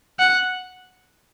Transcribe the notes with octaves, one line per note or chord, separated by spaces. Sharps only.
F#5